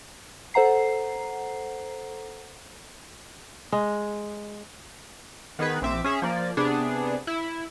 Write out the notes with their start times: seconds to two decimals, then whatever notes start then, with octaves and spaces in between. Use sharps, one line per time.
0.54 A4 C5 F#5 A#5 C7
3.72 G#3
5.59 D#3 B3 G#4 B4
5.82 A#1 C4 E5 D6
6.04 C#4 G#4 E5
6.22 F3 A#3 D5
6.57 C3 B3 D4 G#4
7.27 E4